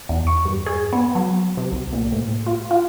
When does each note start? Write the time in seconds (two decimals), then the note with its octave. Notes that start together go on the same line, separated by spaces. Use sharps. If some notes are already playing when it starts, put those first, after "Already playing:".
0.09 E2
0.27 C#6
0.45 G2
0.66 G#4
0.93 B3
1.15 F#3
1.57 C3
1.72 C2
1.93 A#2
2.12 A2
2.47 F4
2.71 F4